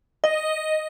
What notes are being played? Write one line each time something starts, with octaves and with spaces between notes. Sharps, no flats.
D#5